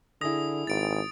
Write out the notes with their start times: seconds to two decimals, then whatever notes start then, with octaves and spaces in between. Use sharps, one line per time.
0.21 D3 E4 G#4 D#6 A#6
0.67 G#1 A6 D7